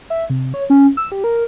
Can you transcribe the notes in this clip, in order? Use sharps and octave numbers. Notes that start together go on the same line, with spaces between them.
E5
C3
C#5
C#4
E6
G4
A#4